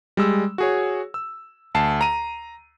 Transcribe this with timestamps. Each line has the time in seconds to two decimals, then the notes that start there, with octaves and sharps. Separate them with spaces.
0.17 G3 G#3 E6
0.58 F#4 G#4 C#5
1.14 E6
1.74 D2 A5 C7
2.01 A#5 D#7